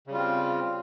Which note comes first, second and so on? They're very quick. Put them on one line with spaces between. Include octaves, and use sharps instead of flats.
C#3 G3 F4 C4